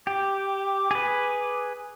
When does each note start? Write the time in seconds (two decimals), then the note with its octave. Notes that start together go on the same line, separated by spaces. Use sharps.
0.07 G4 D6
0.91 G#4 B4